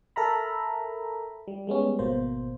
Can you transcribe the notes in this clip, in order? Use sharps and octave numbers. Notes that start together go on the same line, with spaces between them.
A4 A#4 E5 A#5 B5
G3
G3 G#3 B3 C#4
G#1 B2 A#3 C5